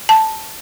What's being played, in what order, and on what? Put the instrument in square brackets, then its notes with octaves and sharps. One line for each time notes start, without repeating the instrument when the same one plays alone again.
[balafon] A5